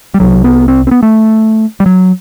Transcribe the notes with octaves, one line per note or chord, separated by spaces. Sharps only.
G3
C2 C3 F#3
B3
C4
C4
B3
A3
G3
F#3